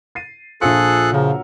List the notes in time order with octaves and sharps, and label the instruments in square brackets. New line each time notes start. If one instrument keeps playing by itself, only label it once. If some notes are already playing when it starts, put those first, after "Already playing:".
[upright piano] A6 C7 D#7
[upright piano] A#1 C#7 [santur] F3 E5 E6 [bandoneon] G#4 A4 F#6
[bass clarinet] C#3 [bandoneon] F3 [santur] F#3 A#4